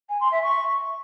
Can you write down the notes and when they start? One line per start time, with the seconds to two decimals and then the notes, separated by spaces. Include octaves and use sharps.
0.09 G#5
0.20 C6
0.32 E5
0.43 C#6